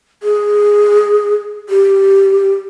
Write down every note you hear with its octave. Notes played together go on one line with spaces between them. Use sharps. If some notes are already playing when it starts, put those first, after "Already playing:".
G#4
G4